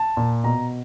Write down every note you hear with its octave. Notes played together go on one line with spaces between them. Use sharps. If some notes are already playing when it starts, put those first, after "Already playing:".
Already playing: A5
A#2
B2 A#5